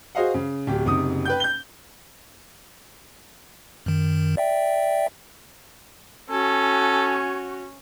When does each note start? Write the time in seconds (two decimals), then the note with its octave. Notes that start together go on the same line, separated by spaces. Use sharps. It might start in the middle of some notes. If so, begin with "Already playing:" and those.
0.15 F#4 G#4 C5 D#5 F5 F#5
0.34 C#3
0.67 D1 G4
0.85 F#1 C3 D#4 D#6
1.25 B4 G5 G6
1.40 G6 G7
3.86 F#2 D#3
4.37 D5 E5 G5
6.30 C#4 F#4 A4 G#5